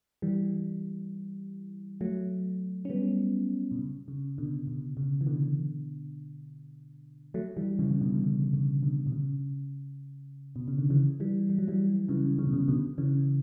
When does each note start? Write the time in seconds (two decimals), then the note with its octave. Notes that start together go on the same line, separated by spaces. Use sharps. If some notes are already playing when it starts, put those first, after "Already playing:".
0.22 E3 G3
2.01 F#3 A3
2.85 C#4
2.90 G3 B3
3.71 B2
3.79 C#3
4.08 C#3
4.38 B2 D3
4.67 B2
4.97 C#3
5.21 E3
5.26 B2 D3
7.34 F#3 A3
7.57 E3 G3
7.79 C#3 E3
7.91 E3
8.01 B2 D3
8.14 D3
8.24 C#3
8.53 C#3
8.83 B2 D3
9.06 B2
9.12 C#3
10.56 B2
10.68 C#3
10.78 D3
10.90 C#3 E3
11.20 E3 G3
11.50 G3
11.59 F#3
11.68 E3 G3
12.09 C#3 E3
12.39 C#3
12.47 B2
12.53 C#3
12.68 B2 D3
12.98 C#3 E3